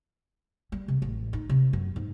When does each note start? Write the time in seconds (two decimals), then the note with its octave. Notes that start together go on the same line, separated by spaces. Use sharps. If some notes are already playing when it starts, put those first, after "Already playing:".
0.72 G3
0.88 C3
1.02 A1
1.33 D#4
1.49 C3
1.73 F#2
1.96 G#2